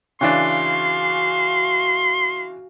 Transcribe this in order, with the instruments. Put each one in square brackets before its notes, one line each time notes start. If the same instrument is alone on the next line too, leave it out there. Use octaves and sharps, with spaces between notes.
[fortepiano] C#3 E3 D4 [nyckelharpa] F#4 F5 [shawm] C6